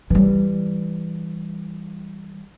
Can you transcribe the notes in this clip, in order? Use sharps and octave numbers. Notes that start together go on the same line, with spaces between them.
E3 G3